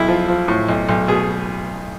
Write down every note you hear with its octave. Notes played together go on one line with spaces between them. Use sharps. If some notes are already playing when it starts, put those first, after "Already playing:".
Already playing: B1 E4
F3
F3
A2
B1
B1
B2 G#4